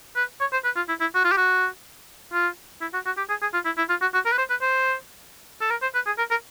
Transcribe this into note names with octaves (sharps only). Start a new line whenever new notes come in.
B4
C#5
C5
B4
F4
E4
E4
F#4
F4
G4
F#4
F4
E4
F#4
F#4
G4
G#4
G#4
F4
E4
E4
F4
F#4
F#4
A#4
B4
C5
B4
C5
A4
A#4
C5
B4
G#4
A#4
A#4